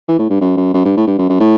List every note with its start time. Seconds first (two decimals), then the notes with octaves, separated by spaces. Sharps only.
0.08 E3
0.19 A2
0.30 G2
0.41 F#2
0.57 F#2
0.74 F#2
0.85 G2
0.97 A2
1.07 G2
1.18 F#2
1.29 F#2
1.40 A2